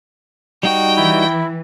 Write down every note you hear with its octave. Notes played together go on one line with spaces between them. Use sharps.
G3 D#4 F#4 G5
E3 E4